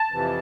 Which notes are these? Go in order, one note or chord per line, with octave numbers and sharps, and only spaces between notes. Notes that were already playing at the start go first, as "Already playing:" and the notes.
Already playing: A5
F2 C3 E3